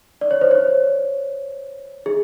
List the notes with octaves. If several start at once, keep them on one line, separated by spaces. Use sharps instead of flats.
D5
C#5
C5
C#5
G#4